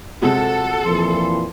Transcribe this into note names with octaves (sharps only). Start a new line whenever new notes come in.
C3 G#3 F4 F#4 A4 F#5
F2 A#2 E3 F3 C6